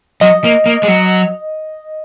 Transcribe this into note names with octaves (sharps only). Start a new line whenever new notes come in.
F#3 D#5
A#3
A#3
G#3
F#3